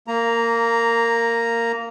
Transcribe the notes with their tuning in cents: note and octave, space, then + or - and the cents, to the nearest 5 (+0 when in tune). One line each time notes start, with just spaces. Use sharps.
A#3 -15 A#5 +0